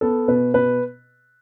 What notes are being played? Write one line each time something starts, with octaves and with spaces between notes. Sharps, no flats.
B3 A4
B2 B4
B2 B4